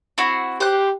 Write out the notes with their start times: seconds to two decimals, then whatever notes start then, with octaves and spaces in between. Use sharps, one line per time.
0.18 C4 E4 F#4
0.60 G4 C5 F#6